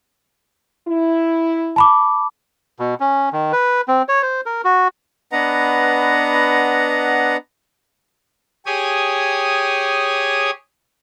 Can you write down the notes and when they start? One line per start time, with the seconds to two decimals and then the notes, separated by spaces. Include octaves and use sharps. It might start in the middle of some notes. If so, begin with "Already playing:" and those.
0.88 E4
1.76 A5 B5 D6
2.79 B2
3.00 C#4
3.33 D#3
3.52 B4
3.88 C4
4.09 C#5
4.22 C5
4.46 A#4
4.64 F#4
5.32 B3 D4 B4 D#5 F#5 A#5
8.66 G4 G#4 C#5 G#5 D#6